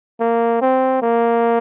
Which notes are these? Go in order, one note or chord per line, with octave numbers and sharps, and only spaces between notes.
A#3
C4
A#3